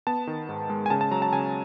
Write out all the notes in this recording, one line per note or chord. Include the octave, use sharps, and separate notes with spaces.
B3 A5
D#3
G#2
G#3
G#5
C#3 A5
A5
F#3 A#5
A5
C#3 G#5